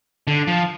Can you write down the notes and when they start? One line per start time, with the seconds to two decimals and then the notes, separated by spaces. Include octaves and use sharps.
0.27 D3
0.48 F3